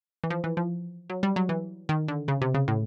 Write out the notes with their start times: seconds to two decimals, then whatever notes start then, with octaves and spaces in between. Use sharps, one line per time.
0.24 E3
0.30 F3
0.44 E3
0.57 F3
1.10 F#3
1.23 G3
1.36 F#3
1.49 E3
1.89 D#3
2.08 D3
2.28 C#3
2.42 C3
2.54 C#3
2.68 A2